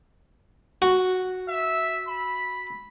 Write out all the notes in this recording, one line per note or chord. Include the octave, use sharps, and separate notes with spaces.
F#4
E5
B5